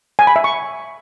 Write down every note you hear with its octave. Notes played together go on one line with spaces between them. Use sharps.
G#5
B5
E5
C#6